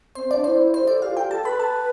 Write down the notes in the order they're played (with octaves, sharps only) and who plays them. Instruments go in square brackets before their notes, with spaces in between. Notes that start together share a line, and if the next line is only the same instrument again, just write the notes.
[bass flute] C4 [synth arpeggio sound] C5
[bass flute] C4
[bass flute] D4 [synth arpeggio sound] D5
[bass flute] E4 [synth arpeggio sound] C5
[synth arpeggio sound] C5
[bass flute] G4
[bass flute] A4 [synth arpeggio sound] D5
[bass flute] G4 [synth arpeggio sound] F5
[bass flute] F4
[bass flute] G4 [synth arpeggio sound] G5
[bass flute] A4 [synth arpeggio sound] A5
[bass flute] B4 [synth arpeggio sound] B5
[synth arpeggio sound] A5